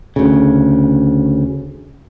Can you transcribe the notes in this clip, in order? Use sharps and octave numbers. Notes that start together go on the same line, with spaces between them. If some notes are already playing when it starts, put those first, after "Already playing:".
D2 C#3